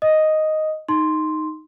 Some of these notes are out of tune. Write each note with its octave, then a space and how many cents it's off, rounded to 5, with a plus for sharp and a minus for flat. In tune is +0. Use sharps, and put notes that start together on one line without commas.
D#5 +0 D#6 +0
D#4 +0 C6 +0